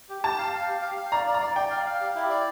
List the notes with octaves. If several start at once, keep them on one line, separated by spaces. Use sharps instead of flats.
G4
G4 A5
F5
F5
G4
F5
F5
D5 A#5
D5
A#5
D5
D5 G5
F5
F5
G4
E4
D5